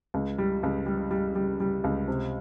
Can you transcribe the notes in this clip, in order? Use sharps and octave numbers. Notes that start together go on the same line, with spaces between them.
C#2
G3
C#2
G3
G3
G3
G3
C#2
C3